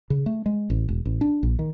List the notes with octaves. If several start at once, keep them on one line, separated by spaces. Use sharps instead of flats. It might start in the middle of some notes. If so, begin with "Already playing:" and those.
C#3
A3
G#3
A1
E1
A1
D4
A#1
D#3